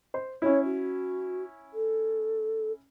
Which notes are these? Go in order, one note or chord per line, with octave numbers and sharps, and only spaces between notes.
C5
C#4 E4 C#5
F#4
A4